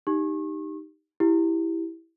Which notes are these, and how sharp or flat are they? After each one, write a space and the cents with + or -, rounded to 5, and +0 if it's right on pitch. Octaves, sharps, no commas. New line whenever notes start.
D#4 +0 G4 +0 C#6 -35
E4 +0 G4 +0